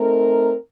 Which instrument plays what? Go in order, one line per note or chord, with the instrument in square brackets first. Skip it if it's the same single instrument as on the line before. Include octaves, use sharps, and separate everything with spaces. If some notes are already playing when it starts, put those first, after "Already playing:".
Already playing: [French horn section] A3 C4 D#4 A#4